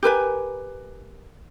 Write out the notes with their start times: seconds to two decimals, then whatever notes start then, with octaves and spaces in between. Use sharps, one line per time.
0.03 G4 A#4 B4 G#5